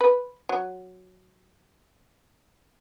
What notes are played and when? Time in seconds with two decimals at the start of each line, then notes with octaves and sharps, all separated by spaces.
0.01 B4
0.49 F#3